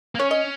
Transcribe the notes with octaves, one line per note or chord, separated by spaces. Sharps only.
A#3
C#4 C#5
D#5